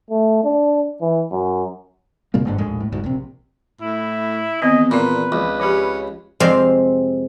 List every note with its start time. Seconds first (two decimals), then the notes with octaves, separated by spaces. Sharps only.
0.11 A3
0.44 D4
1.01 E3
1.31 F#2
2.34 A#2 C#3 G#3 A#3
2.45 G1 G#2 D3
2.58 A#1 D#2 A2 G#3
2.80 A2
2.92 F1 D2 G#2
3.04 A#1 C3
3.81 A2 E4
4.62 E2 D#3 B3 C4 D#5
4.91 A#2 B4 D5 D6
5.32 C#2 F3
5.60 F3 C#4 G4
6.40 F2 C3 G#3 F5 G5 C6